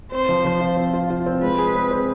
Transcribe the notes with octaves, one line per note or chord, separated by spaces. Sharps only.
C4 C5
F3
F3
F4
C4
F4
F4
C4
G#3 B4
G#4
C4
C4